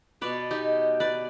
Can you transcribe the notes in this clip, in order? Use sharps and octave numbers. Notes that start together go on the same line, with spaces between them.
B2 B3 B4 D5
D#4 G4
B4 D5